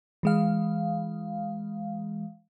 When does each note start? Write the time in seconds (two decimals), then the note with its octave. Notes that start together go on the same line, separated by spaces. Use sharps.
0.23 E3 G#3 F5